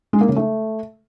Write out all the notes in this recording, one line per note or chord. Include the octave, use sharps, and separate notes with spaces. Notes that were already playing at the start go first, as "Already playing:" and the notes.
G#3
A#3
C#3
A3